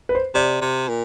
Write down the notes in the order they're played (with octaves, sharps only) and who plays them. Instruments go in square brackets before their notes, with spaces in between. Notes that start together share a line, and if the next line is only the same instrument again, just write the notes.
[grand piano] B4
C5
[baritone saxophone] C3 [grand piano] D5
[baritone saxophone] C3
A#2